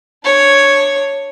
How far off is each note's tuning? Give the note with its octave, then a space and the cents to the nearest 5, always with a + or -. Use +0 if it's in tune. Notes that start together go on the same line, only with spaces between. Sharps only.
D4 +15 C#5 +0